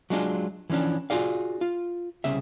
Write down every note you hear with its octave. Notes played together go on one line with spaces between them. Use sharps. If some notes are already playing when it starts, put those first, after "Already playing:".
F#3 G#3 D4 F4
E3 F3 B3 C#4 D4
F4 F#4 G#4 D5 F5
F4
C2 C#3 E5